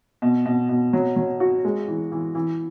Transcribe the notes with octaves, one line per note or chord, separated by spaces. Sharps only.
B2
B2
B2
F#3
F#3
F#4
G#3
E3
E3
E3